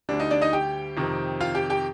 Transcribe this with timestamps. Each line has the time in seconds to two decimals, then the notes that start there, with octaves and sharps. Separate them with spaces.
0.09 D2 D3 G3 D4
0.20 D#4
0.31 D4 D5
0.41 D#4 D#5
0.53 G4 G5
0.97 F2 C3 D#3
1.40 F4 F5
1.55 G4 G5
1.70 G4 G5